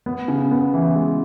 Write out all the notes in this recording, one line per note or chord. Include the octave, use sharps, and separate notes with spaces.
B3
C#3
B3
E3
G#3